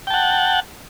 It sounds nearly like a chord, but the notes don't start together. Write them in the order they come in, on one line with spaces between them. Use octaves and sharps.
G5 A5 F#5